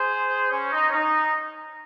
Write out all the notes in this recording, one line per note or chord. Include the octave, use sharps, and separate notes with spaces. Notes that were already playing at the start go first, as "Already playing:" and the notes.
Already playing: G#4 C5
C#4
D#4
C#4
D#4